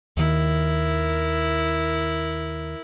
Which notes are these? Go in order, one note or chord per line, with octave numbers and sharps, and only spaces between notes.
D#2 D#3 E4 A#4